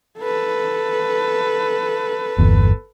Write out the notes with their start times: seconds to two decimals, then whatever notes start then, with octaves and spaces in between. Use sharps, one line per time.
0.20 A4 B4
2.38 G1 E2